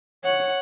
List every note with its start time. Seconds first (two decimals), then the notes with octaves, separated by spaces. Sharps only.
0.24 C#5 F#5